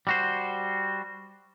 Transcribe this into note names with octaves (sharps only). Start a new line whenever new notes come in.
G3 F#4 C5